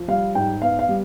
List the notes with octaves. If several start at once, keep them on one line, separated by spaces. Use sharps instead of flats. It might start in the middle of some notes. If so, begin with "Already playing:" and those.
Already playing: F3
G3 F5
G#2 G5
B3 F5
F5
G3